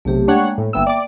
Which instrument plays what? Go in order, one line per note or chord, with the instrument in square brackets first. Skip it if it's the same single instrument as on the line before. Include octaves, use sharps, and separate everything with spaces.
[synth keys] B1 C3 [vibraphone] A3 G4
[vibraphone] G#3 A#3 G5 [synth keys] D4 C#5 F#5
[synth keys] A2
[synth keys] G1 B3 E6 [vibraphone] A#3 E5 G5
[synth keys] D5 D6